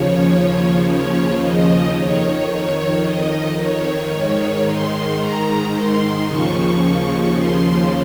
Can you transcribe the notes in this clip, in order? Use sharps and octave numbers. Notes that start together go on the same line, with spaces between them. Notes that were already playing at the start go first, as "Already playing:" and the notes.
Already playing: D#2 C#3 F3 C#5
C#5
D#5
F2 D#3 C#5
C#5
D#5
C#5
G#2 D#3 C#5
C6
A#5
C6
D#2 C#3 F3 C#6
C#6
C6